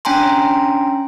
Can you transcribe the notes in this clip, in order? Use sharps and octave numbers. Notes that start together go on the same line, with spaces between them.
C#4 D4 G5 G#5 A#5 C6